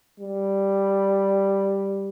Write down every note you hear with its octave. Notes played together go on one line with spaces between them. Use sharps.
G3